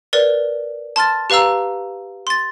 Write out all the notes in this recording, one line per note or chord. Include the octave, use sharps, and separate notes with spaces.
A#4 B4 D5
A5 C6 F6 A6
G4 B4 F5 A#5 E6
C6 A6